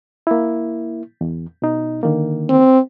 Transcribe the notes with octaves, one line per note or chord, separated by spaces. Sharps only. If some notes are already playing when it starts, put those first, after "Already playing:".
A#3 E4
E2
B2 D#4
D3 D#3 A#3
C4